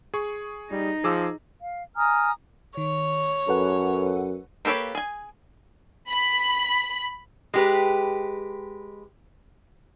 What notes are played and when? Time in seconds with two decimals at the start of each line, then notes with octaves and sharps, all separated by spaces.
0.14 G#4 C#6
0.71 G3 D#4
1.04 F3 G#4 D6 E6
1.60 F5
1.96 G#5 A#5 D#6 F6
2.77 D#3 C#5
3.48 F#2 A4 B4 F#5
4.65 A#3 G4 A4 B4 C#5
4.95 G#4 G#5
6.10 B5
7.54 G#3 G4 B4